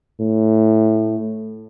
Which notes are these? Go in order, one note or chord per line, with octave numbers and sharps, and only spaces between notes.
A2